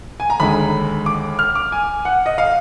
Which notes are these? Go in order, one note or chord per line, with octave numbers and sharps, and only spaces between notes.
G#5
A#5
D#2 D3 G#3 B5
D6
F6
D6
G#5
F#5
D#5
F5